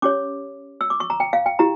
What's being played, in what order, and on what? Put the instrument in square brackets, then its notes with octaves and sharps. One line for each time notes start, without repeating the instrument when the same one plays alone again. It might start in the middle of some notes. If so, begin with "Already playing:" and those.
[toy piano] C#4 G4 C#5 D6
E6
D6
C#6
A#5
G5
F5
G5
E4 G4 A#5